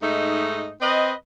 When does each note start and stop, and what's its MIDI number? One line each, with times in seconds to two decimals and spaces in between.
0.03 0.72 44
0.03 0.72 57
0.03 0.72 63
0.81 1.12 60
0.81 1.12 71
0.81 1.12 75